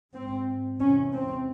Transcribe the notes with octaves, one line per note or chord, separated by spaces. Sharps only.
G#2 C4
E2 C3 C#4
C4